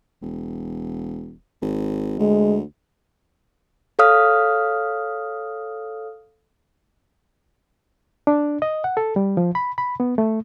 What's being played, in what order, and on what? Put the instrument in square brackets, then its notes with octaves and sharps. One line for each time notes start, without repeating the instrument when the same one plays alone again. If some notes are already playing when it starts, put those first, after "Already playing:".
[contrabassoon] E1
G#1
[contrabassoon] D2 [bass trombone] G#3
[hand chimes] A4 C#5 F5 D#6 F6
[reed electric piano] D4
D#5
F#5
A4
G3
F3
B5
B5
B3
A3